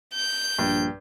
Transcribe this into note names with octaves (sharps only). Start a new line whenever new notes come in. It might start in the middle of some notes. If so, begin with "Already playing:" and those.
G6
A#1 G2